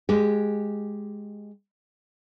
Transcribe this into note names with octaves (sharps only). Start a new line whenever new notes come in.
G#3 G4